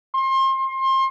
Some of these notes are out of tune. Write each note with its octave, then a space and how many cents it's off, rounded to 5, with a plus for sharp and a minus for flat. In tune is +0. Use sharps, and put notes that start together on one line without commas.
C6 +30